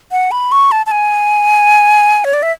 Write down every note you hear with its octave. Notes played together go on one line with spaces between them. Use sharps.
F#5
B5
C#6
A5
A5
G#5
C#5
D5
E5